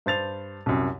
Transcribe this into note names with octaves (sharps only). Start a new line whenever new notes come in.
G2 C5 A6 F7
C2 F#2